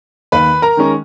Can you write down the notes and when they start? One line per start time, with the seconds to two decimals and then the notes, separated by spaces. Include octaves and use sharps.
0.32 D#2 B4 B5
0.62 A#4 A#5
0.77 D#3 G#3 C#4